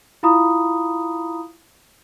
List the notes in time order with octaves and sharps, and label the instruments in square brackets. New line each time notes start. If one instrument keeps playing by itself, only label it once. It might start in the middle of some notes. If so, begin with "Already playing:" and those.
[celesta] E4 F4 F5 A#5 B5 D#6